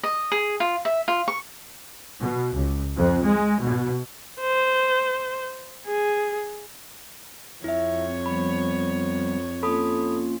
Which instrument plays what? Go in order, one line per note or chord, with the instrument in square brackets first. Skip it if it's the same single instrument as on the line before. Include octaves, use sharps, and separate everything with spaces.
[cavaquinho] D#5
G#4
F4
E5
F4
C#6
[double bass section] B2
C#2
F2
G#3
B2
[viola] C5
G#4
[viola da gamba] F2 C#5 [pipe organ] C4 [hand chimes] E4 E5
[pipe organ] F3 G3 B3 [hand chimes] B5
[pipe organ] A#3 C#4 F4 [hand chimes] A4 B5 D#6